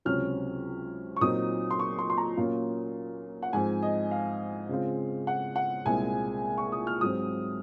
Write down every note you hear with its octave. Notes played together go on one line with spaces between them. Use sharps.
C#2 C3 F#3 C#4 F6
C#6
A#2 F#3 C4 D#4 D#6
C6
C#6
C6
C6
A#5
A#2 F#3 A#3 C#4 F4
F#5
G#2 F3 C4 G#5
D#5
F5
C#3 G#3 C4 F4
F#5
F#5
C2 A#2 G#3 C4 G#5
C#6
D#6
F6
G#2 F#3 C4 D#6